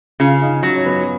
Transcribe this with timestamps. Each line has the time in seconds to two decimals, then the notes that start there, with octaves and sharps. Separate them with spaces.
0.20 C#3 F4
0.42 D#4
0.63 F#3 C#4
0.75 C#4
0.86 B3